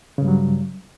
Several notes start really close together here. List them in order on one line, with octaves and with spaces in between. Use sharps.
C#3 G2 G3 F#3